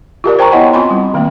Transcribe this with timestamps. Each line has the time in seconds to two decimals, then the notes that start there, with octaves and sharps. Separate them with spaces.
0.24 F4 G4 A#4 D5
0.39 C5 G5 A5 A#5 C#6
0.52 B3 E4 C#5 D#5 F#5 G#5
0.73 C4 F4 G#5 B5 C6
0.90 G3
1.14 D#3 A3 A#3 C4